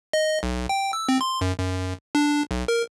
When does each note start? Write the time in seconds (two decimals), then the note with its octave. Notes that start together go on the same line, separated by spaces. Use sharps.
0.13 D#5
0.43 B1
0.69 G5
0.93 E6
1.09 C4
1.21 C6
1.41 F#2
1.58 F#2
2.15 D4
2.51 B1
2.68 A#4